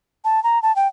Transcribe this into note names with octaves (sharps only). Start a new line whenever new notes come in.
A5
A#5
A5
G5